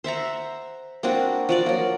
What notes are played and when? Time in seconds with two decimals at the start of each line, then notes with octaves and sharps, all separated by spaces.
0.04 C5 E5 F#5 A#5
1.03 A#3 C4 D4 F#4
1.49 F3 F#4 D5
1.66 F#3 A#3